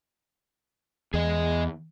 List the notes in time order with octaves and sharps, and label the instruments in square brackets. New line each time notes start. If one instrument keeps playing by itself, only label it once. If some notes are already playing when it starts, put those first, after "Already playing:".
[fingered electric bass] E2 [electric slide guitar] G#4 D#5